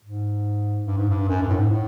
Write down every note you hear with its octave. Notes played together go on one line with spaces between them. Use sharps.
G#2
G2
G#2
G2
F#2
G2
A2
G#2
A2